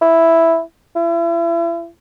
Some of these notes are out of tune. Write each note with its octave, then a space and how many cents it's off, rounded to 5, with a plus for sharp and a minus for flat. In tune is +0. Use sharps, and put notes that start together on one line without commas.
E4 +0
E4 +35